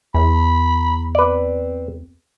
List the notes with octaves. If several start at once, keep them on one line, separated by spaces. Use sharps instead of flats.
E2 B5
C4 B4 D5